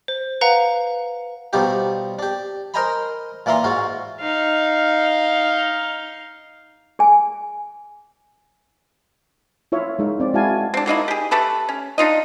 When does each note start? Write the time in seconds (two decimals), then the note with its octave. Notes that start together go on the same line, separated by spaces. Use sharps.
0.08 C5
0.41 B4 F5 F#5 A#5
1.53 B2 F3 G3 D4 D#4 G4
2.19 D4 G4
2.74 A#4 C5 D#5 G#5 A#5 B5
3.46 A#2 E3 A#3 E5 A#5 C6
3.64 G#2 F4 F#4
4.21 D#4 F5
6.99 G#4 G#5
9.72 E4 F4 C#5 E5 F5
9.99 G#3 D#4
10.20 C4 D5
10.34 G#3 E4 F#4 F5 G#5 A5
10.74 C4 D4
10.86 F#3 A#3 D#4 E4
11.08 G4 G#4
11.31 A3 G4 A4 B4
11.69 C#4
11.98 D4 D#4 F4 D#5